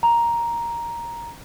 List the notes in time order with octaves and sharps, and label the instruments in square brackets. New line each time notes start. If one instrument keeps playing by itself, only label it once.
[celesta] A#5